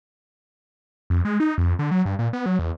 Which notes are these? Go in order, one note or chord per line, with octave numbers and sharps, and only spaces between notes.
F2
G#3
D#4
F2
D3
F#3
G2
A#2
B3
F#3
E2